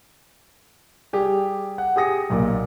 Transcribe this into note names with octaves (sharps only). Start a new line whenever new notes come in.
G3 G4 G#4
F#5
G4 G#4 D#6 A#6 C#7
B1 A#2 D6